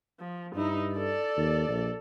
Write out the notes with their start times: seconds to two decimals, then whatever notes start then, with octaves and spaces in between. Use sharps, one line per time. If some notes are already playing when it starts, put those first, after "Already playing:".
0.20 F3
0.55 G2 D#4 E4
0.94 A4 D5
1.37 D#2
1.68 A#1